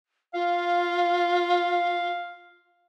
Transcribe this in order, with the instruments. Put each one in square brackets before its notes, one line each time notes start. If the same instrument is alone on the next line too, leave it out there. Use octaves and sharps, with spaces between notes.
[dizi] F4 [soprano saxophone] F5